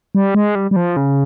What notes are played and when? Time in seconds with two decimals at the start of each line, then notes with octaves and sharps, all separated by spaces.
0.15 G3
0.35 G#3
0.55 G3
0.71 G3
0.76 F3
0.97 C#3